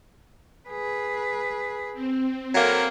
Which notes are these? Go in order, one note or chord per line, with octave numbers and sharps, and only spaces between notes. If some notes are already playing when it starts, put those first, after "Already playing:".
G#4 B4
C4
F#3 A#3 C4 A4 B5 F6